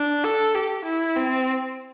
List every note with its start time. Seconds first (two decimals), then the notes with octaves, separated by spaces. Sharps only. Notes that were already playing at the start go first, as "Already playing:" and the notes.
Already playing: D4
0.24 A4
0.54 G4
0.85 E4
1.16 C4